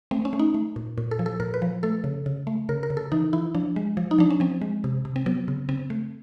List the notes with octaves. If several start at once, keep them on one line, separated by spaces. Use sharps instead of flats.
A3 C4
C#4
A3
D#4
A3
A#2
A#2
A4
F3
A4
A#2 A#4
B4
F3
A3 A4
C#3
C#3
A3
C#3 A#4
A#4
C#3
A4
E3 D#4
E3 E4
F3 D4
G#3
F3
D#4
F3 D4
C#4
F3 C4
G#3
C3
C3
C4
F#3 B3
C#3
C#3 C4
A3